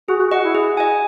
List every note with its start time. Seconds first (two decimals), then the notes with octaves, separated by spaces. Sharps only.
0.08 F#4 G#4
0.19 F#4
0.31 F#4 D#5 F#5
0.43 E4
0.55 G#4
0.77 D#5 G#5